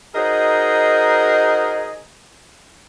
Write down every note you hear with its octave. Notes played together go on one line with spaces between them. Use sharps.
D#4 F#4 G#4 A#4 C5 D#5